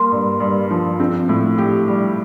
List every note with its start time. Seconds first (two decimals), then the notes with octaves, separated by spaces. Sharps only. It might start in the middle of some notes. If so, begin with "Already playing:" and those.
Already playing: G3 A#3 C6
0.12 G2
0.40 G2
0.71 F3
1.00 C4
1.29 A2
1.58 G4
1.88 G3